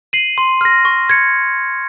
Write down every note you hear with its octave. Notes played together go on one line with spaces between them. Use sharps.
C7 D#7 F#7
C6
F6 A#6
C#6
G#6 C#7